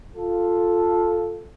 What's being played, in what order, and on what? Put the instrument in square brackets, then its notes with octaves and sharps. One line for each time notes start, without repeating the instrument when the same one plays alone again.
[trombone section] F4 A4